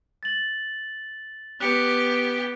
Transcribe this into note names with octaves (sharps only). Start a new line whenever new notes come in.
A6 F#7
B3 G4 F#6 C#7